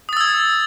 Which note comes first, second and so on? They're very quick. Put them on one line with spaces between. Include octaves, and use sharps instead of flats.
D#6 A6 E6 G#6